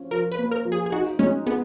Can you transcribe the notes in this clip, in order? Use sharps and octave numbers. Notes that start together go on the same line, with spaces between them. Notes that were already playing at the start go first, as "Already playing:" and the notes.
Already playing: F3 C#4
F3 A#4
B4
A#3
A#4
F3
G#4
G#4
D#4 F#4
G#3 C#4
B3 G#4